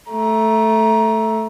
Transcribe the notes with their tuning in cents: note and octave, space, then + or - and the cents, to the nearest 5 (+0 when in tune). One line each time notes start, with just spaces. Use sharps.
A3 +0 A#5 +20